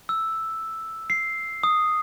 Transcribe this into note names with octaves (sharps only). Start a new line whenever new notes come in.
E6
C7
D#6